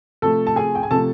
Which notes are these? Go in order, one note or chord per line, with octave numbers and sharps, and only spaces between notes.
C3 F3 A3 A4 A5
A5
G#4 G#5
G5
G#5
C3 F3 A3 A4 A5